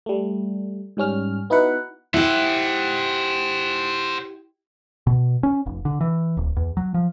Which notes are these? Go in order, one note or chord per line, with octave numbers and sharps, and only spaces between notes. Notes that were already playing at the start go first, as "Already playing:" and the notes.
G3 A3
G#2 G3 C#4 F6
B3 D#4 E4 F#4 B4 F#5
E4 G4 C5 F#5
B2
C#4
F1
D3
E3
D1
E2
F#3
F3